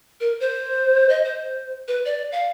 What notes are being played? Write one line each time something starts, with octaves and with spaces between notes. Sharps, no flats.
A#4
C5
D#5
C5
B4
D5
F5